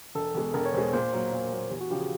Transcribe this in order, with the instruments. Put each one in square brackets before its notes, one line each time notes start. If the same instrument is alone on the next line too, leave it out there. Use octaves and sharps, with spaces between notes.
[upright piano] E1 [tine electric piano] A4
[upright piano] E2 B2 G#3
[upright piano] E1 [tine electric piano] A#4
[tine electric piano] C#5
[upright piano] E2 B2 G#3 [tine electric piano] C5
[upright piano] A#2 [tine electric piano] C5
[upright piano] F#3 A#3
A#2
F#3 A#3
[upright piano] E2 [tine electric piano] G4
[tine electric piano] F#4
[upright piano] C#3 F3 [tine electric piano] G4
[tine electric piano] G#4